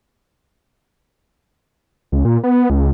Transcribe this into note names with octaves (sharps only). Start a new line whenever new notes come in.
C#2
A#2
B3
C#2